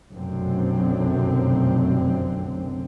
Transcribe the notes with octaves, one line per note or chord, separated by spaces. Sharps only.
F1 B1 F#2 D3 C4